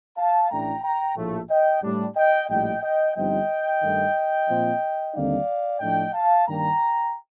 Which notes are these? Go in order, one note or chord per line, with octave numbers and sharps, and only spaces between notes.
F5 A5
A1 A2 A3 D4 G5 A#5
G5 A#5
A#1 A2 F3 A3
D#5 G5
A2 G3 D4
D#5 G5
A#1 A2 G3 D#5 G5
D#5 G5
G1 G2 F3 C4 D#4 D#5 G5
G2 D#3 A3 D#4
A#2 F3 C4
D#2 D3 G3 C4 D#4 D5 F5
A2 F3 A3 D4 D#5 G5
F5 A5
G2 D#3 A#3 D4 G5 A#5